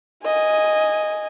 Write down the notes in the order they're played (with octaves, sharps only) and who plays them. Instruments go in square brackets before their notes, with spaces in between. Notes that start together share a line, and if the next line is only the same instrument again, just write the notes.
[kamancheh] D#5 G#5